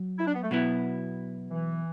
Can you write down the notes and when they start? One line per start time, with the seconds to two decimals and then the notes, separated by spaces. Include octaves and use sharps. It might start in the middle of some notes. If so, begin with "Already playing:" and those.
Already playing: F#3
0.18 E4
0.26 D4
0.35 B3
0.43 A3
0.51 B2 F#3 B3 E4
1.50 E3